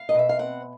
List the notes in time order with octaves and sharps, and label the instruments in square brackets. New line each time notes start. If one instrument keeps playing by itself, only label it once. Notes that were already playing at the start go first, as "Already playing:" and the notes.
Already playing: [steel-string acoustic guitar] F5
D#5
B2 E5
F5
C4 F#5